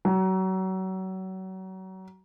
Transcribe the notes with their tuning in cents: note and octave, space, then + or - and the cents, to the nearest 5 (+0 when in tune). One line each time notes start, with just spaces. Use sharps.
F#3 +30